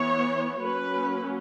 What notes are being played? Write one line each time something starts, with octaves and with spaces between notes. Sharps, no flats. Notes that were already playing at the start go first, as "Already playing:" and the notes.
Already playing: E3 B3 C#5
F#3 A#3 C#4 B4